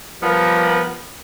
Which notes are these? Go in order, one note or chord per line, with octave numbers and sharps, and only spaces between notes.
F3 G3 B3 A#4